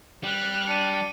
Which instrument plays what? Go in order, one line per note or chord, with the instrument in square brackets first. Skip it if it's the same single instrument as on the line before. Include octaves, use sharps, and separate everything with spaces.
[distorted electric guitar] G3 [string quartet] F6 F#6
[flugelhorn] D4 [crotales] C#7 D#7